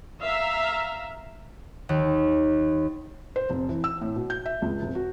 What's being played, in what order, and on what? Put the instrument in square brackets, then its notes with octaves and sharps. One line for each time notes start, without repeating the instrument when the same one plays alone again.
[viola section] E5 F5 A#5
[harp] D#2
[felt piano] C5
F1
E3
E6
A2
B2
G6
E5
C#2
F1
F#4